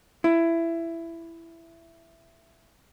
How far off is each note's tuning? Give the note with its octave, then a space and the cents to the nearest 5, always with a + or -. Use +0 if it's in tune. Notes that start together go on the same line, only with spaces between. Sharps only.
E4 +15